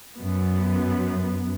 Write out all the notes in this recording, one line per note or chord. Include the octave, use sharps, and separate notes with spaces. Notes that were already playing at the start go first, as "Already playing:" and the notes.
F#2 B3